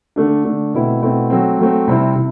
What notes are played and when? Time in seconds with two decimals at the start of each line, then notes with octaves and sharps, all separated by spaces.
0.16 D3 A3 D4
0.44 D3 A3 D4
0.74 B2 A3 C4 E4
1.02 B2 A3 C4 E4
1.30 F#3 A3 C4
1.59 F#3 A3 C4
1.88 C3 G3 C4 E4
2.15 C3 E4